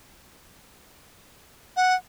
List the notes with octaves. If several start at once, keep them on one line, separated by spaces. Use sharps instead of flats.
F#5